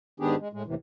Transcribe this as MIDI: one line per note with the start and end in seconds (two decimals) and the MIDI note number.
0.20 0.36 44
0.20 0.36 51
0.20 0.36 59
0.20 0.36 62
0.20 0.36 67
0.20 0.36 68
0.40 0.48 56
0.53 0.63 45
0.53 0.63 56
0.66 0.75 39
0.66 0.75 45
0.66 0.75 48
0.66 0.75 52